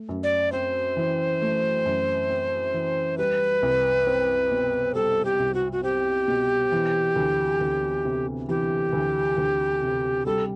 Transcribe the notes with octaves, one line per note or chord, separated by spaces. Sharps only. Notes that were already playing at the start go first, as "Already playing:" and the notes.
Already playing: A3
F#2
D5
C4 C5
E3
A3
F#2
C4
E3
G3 B4
C2
C4
B2
G3 A4
G4
C2
F#4
F#4
C4 G4
B2
E3
D2
D2
C3
E3 G4
D2
D2
C3
G3 A4